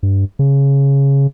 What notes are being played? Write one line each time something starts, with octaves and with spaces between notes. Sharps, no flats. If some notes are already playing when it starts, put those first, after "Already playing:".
G2
C#3